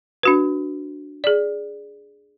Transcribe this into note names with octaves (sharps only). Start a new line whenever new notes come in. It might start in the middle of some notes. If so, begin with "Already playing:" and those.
D4 F#4 B4
G#4 D5